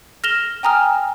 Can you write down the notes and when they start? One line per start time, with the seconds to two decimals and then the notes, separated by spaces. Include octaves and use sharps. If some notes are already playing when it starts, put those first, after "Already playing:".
0.24 F6 A#6 E7 F7 G7
0.63 G5 G#5 A#5 D#6 F6